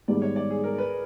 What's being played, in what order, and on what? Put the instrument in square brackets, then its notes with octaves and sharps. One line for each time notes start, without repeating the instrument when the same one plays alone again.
[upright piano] G#2 D#3 G3 B3 [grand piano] D5
[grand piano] C#5
D5
G#4
A#4
B4